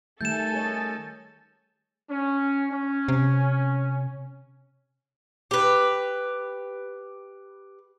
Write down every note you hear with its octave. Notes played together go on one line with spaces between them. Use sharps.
D#3 G3 A3 A4 G#5 G6 A6 E7
G#4 C#5 D#5
C#4
C#4
C3
G4 B4